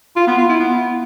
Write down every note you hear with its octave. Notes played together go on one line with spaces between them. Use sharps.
F4
B3
F4
E4
B3